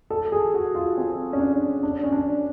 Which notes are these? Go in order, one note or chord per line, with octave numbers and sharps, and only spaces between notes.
A4
G#4
F#4
F4
C4
C#4
D4
D4
C#4
D4